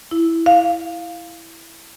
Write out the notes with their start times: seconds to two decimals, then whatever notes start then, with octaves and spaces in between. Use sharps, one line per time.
0.11 E4
0.46 F5